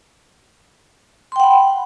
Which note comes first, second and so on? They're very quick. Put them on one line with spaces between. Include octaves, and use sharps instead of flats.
C6 G5 F#5 B5